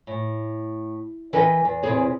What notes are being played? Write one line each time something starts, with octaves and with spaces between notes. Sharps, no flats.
A2
E3 A#4 B4 D#5 F#5 G5
E2
E2 C3 G#3 E4 G#4 C#5